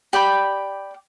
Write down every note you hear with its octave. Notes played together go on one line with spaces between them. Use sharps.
G4 D5 G5 B5